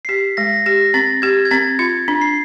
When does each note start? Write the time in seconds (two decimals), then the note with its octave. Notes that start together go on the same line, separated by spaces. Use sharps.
0.05 C7
0.09 G4 B6
0.37 G#3 A#6
0.66 G4 A#6
0.94 C4 A6
1.22 G4 G#6
1.45 G#6
1.51 C4 A6
1.79 F4 G#6
2.08 D4
2.21 C7